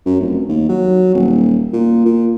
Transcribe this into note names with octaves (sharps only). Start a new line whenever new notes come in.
F#2
F1
D#2
F#3
D#1
A#2
A#2